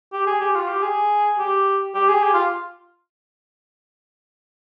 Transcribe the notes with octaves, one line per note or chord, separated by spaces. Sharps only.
G4
G#4
G4
F4
G4
G#4
G4
G4
G#4
G4
F4